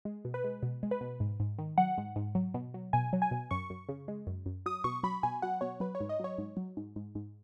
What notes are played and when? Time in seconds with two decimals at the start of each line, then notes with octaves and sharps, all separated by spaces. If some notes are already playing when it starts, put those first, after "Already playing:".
0.05 G#3
0.25 B2
0.34 B4
0.44 G#3
0.63 B2
0.83 G#3
0.91 B4
1.01 B2
1.20 G#2
1.40 G#2
1.58 D#3
1.78 F#3 F#5
1.98 G#2
2.16 G#2
2.35 F#3
2.54 B2
2.74 F#3
2.93 B2 G#5
3.13 F#3
3.22 G#5
3.31 B2
3.51 F#2 C#6
3.70 F#2
3.89 C#3
4.08 G#3
4.27 F#2
4.46 F#2
4.66 F#3 D#6
4.84 B2 C#6
5.03 F#3 B5
5.23 B2 G#5
5.42 F#3 F#5
5.61 B2 C#5
5.80 F#3 B4
5.95 C#5
6.00 G#2
6.09 D#5
6.20 F#3 C#5
6.38 G#2
6.57 F#3
6.77 G#2
6.96 G#2
7.15 G#2